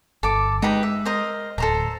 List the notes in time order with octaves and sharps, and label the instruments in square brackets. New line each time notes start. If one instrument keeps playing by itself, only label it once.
[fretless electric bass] G1 [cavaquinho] A4 D6
[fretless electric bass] G#3 [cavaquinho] D#4 G4 B4
[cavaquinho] E5
A#4 C5 D#5
[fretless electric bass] D1 [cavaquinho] A4 C5 A#5